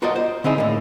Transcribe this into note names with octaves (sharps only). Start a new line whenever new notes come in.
F4 F#4 A#4 C5 D5 D#5
C5
D3 C4 D#4 E4 G#4
A2 A#3